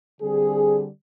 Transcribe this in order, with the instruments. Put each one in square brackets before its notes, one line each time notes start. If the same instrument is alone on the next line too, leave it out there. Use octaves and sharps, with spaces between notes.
[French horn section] D3 G3 C4 G#4